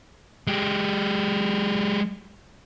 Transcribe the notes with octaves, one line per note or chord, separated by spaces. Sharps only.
G#3 G4